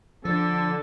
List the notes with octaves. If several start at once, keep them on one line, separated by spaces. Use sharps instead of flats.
D3 F3 A4